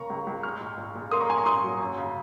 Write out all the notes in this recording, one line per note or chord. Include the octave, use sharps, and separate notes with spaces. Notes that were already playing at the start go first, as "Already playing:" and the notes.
Already playing: C#3 A#3 A#5 C#6
C#2
C#2
G#3 C#6 F6
A#2
A#2
A#2
A#3 C6 D#6
A#5 C#6
A#2 G#5 C6
A#5 C#6
A#2 C6 D#6
F#3
F#2
C#3